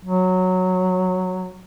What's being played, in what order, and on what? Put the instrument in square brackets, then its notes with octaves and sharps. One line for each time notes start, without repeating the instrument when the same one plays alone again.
[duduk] F#3